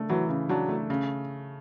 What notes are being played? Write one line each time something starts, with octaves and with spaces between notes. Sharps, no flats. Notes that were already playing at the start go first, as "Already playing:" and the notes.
Already playing: C#3 A3 D4
E3 F#3
C#3
F#3 D4
A3
C#3